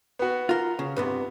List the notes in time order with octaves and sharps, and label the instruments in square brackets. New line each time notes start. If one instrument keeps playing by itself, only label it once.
[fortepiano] B3 F#4
[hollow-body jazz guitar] F4 A#4
C#3
[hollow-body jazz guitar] C2 G2 C3 [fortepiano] B3